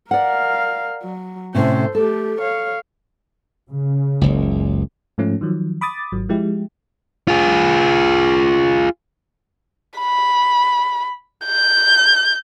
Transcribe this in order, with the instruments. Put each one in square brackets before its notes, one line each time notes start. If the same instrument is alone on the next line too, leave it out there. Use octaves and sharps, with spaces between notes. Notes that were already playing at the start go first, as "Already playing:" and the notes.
[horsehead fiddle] A#4 F5 [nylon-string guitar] D5 F#5
[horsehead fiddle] F#3
[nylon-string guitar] A2 C3 C#4 [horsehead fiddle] A4 C5
[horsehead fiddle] A3 G4 [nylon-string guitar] A4
[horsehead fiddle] C#5 F5
[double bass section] C#3
[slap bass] F#1 C#2
[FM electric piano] G#2 F3 A3 C#4
D#3 F3 F#3
B5 D6 D#6 A6
G#1 F#3
F3 G#3 E4 G4
[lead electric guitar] F4 G#4
[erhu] B5
G6